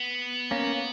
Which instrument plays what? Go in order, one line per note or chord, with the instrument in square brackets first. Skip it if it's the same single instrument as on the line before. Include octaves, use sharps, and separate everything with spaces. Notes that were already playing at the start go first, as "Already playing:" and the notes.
Already playing: [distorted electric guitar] B3
[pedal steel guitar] A#3 C#4